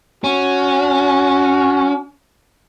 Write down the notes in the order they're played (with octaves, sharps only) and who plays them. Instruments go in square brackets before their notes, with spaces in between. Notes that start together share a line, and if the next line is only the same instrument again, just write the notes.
[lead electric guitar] C#4 [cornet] F#4